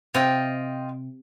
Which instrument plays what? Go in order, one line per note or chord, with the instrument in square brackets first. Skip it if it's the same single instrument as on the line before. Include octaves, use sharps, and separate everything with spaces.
[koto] C3 [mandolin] F4 D#5 G5